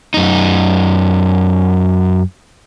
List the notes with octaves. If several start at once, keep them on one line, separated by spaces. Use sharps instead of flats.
F#2 D#4